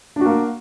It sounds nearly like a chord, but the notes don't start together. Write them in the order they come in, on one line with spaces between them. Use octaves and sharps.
D4 F#4 A#3